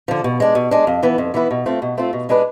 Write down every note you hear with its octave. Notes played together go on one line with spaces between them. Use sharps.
D3 F3
B2
G#3 D4
B2
G#3 D4
F2
E3 B3 E4 B4
F2
E3 B3 E4 B4
B2
A3 C4 F4
B2
A3 C4 F4
B2
G#3 D4 G#4 B4